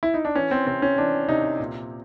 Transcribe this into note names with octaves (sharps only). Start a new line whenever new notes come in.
E4
D#4
D4
E3 C#4
C4
C3 C4
C#4
E3 D4
C3 D#4
A#2